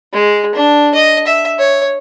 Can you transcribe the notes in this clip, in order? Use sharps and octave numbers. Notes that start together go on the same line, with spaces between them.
G#3
D4
D#5
E5
C#5